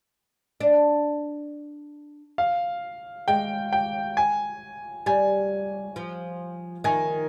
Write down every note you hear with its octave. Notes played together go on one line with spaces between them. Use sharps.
D4
F5
G#3 G5
G5
G#5
G3 G#5
F3
D#3 G#5